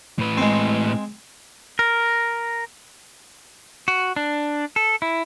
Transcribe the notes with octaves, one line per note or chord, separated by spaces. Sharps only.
A2 B4
G#3 C4
A#4
F#4
D4
A4
E4